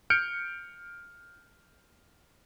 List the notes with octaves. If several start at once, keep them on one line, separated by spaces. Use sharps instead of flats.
F6 G6 C#7 D7